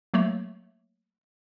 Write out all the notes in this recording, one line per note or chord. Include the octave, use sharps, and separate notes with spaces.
F#3 A3 A#3 C#5